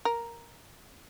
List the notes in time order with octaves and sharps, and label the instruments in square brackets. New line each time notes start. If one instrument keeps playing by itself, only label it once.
[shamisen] A#4